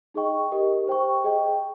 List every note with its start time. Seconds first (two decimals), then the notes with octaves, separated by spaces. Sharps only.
0.14 D#4 G#4 D#5 G5 C#6
0.52 G4 A#4 D#5
0.88 C5 G5 C#6
1.24 G#4 D#5 G5